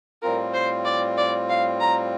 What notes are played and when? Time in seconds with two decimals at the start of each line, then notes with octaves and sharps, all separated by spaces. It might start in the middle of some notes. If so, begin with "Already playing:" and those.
0.22 A2 G3 C4 F4 A#4
0.54 C5
0.85 D5
1.17 D5
1.49 F5
1.80 A#5